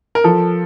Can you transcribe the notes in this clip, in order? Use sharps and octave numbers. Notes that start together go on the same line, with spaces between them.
A#4
F3 A4